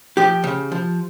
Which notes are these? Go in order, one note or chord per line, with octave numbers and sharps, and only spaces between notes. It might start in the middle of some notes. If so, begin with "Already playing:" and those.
F3 G4
C#3
F3